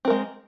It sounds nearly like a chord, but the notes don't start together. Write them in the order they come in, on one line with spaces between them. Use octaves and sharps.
C4 A#4 G#3